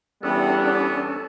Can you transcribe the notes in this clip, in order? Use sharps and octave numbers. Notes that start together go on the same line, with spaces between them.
E2 G3 B3 C#4 D4 A4